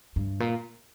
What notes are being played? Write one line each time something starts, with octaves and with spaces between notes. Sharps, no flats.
G2
A#2